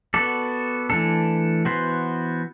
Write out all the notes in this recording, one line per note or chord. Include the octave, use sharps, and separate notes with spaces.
B3 F#4 A4 D5
E3 A3 D4 A4
E3 B3 F#4 C5